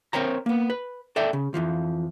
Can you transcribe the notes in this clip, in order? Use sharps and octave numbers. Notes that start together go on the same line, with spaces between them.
C4 A#4 C5 C#5 G5 A#5
A#3 B3
B4
A4 D5 E5 G5
C#3
F2 E3 F3